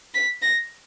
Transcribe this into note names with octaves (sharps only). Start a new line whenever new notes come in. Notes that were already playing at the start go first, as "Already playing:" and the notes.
B6
A#6